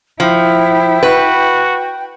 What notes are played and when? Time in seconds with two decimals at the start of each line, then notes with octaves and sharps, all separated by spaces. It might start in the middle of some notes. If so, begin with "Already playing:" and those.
0.20 F3 E4 G5
1.03 F#4 B4